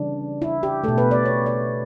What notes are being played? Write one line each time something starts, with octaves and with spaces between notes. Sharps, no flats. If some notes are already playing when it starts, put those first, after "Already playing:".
Already playing: C#3 E3 G3 D4
E4
G4
B2 A3 A4
B4
D5
C#5
D5